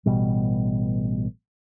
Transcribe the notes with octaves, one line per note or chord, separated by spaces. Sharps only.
A1 B2 G3